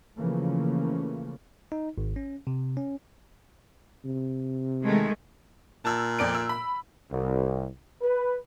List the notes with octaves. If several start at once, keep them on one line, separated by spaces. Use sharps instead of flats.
C#3 E3 F3 A3 A#3 C#4
D#4
G#1
C#4
C3
C#4
C3
D#3 G#3 A3
A#2 A5 E6
F2 D5 D7
E6
B5
C2
B4